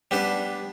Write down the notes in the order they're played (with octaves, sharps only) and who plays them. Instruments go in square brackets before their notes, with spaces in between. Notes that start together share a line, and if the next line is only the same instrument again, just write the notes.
[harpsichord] G3 B3 D4